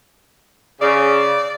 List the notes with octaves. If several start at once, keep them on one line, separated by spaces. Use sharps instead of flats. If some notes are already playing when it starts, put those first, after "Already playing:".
C#3 D5